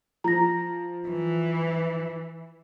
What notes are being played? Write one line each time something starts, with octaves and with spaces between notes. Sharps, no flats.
F3 A#5 A#6
E3